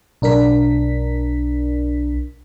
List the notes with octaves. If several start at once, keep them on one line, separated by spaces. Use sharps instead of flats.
B1 D4 A#4 B6